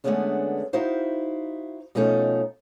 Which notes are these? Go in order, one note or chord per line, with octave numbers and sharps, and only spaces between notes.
D3 G#3 A3 B3 C#4 D4
D#4 E4 F#4 C5 F5
B2 F3 A3 C#4 D#4 A4